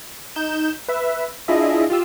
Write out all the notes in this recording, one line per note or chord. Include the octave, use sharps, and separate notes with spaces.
D#4 G6 E7
B4 E5
D4 E4 F4 G#4 D#5 E5
F4 G4 E6